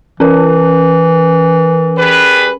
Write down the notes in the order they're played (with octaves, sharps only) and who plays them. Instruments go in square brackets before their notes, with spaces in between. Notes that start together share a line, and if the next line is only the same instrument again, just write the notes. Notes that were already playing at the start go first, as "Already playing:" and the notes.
[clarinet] E3 [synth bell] C#4 A#4
[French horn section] G3 G#4 B4